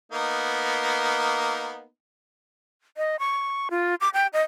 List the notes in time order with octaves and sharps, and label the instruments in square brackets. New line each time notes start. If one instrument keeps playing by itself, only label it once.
[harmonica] A#3 B3 D#4
[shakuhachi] D#5
C#6
F4
D6
G5
D#5